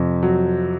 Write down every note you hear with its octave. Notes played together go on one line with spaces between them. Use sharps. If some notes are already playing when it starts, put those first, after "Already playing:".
Already playing: F2 C3
F#3